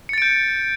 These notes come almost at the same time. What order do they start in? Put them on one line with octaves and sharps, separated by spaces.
C#7 A6 D7 G6